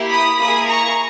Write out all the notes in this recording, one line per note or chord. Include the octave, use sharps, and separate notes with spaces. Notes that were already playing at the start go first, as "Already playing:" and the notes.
Already playing: A#3 E4 G4
B5 D#6
A#3 E4 G#4 B5 D#6
A#5 C#6